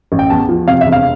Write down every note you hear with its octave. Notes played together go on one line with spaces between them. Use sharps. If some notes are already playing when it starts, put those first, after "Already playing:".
A1
G5
E2 A5
F3
C3 F5
E5
E1
F5